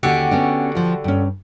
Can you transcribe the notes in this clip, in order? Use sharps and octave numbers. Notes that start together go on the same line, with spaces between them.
D#2 D3 C#4 F#4 G4
B3 C#4 D4
F3 F4
G2 C#4